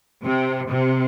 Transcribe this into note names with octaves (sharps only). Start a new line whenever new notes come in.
C3
C3